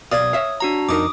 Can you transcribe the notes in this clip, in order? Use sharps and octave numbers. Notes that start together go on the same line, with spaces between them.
B1 D5 F5 D#6 G#6
C#5 E5 F5
D4 F#4 A#5
F2 D#4 A#4 D6 D#6